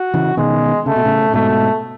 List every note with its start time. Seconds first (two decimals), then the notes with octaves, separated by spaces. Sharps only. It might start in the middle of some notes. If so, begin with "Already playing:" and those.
Already playing: F#4
0.14 C#3 E3
0.37 B2 D#3 G#3
0.86 C#3 A3
0.96 B2
1.05 A2 C#3
1.33 G#2 B2 A3